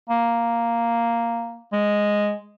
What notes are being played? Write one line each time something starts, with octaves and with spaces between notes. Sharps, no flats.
A#3
G#3